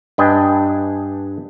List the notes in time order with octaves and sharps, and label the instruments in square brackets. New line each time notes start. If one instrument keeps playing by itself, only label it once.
[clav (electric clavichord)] G2 D4 B4 D#5 G5 G#5